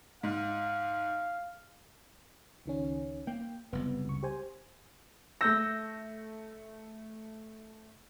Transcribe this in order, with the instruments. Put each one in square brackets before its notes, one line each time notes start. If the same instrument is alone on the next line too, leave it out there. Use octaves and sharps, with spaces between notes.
[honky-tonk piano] G#2 [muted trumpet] F5
[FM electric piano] C#2 D#3 C#4
[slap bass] A#3 [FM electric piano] G5
[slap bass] F#1 C2 [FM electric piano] B3
[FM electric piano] C#2 C#6
G4 C5 G#5
[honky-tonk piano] A3 A#6 [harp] E6 G6